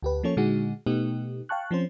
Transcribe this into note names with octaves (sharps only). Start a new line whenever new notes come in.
D2 G4 B4
F3 A#3 C#4 A4 C#5
A#2 D3 G#3 D#4 F#4 G#4
B2 A3 B3 D#4 G4
F5 G5 A5 C#6 F#6
F3 C4 C#4 C5